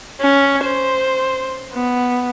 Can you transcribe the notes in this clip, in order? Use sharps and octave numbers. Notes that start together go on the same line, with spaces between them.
C#4
C5
B3